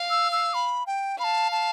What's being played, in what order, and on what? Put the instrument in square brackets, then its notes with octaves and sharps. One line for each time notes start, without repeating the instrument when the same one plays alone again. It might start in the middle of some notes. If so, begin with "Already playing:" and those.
Already playing: [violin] F5
[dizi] E6
E6
B5
G5
[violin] F5 [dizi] B5
[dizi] A5
A5